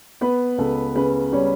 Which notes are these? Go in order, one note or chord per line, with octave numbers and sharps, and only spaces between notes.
B3 B4
C#2 A4
C#3 B4
G3 C#4 C#5